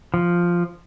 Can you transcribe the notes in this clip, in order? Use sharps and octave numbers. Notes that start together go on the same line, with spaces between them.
F3